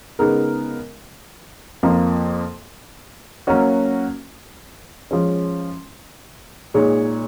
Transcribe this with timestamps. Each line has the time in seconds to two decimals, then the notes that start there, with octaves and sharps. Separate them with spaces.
0.19 C#3 G#3 B3 D#4 A#4
1.83 F2 F3 A#3
3.47 F#3 A#3 C#4 F#4
5.11 F3 G#3 C#4
6.74 A#2 G#3 D#4 G#4 C#5